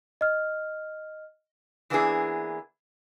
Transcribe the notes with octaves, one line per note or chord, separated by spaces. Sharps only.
D#5 F6
E3 A#3 B3 D4 E4 G#4